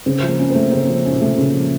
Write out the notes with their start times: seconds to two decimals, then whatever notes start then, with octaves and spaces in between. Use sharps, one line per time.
0.06 C#3 C4
0.23 F3
0.28 A#3
0.39 C#4
0.50 A3 C4
0.67 A#3
0.72 C#3 C4
0.89 F3
1.06 C#4
1.11 A#2
1.16 C3
1.21 A3
1.38 A#2 C#3
1.55 F3